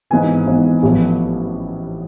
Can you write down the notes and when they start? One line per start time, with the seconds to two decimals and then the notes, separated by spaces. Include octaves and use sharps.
0.10 G#1 G#2 E3 B3 G#5
0.47 G#1 G#2 E3 B3
0.83 A1 A2 F3 B3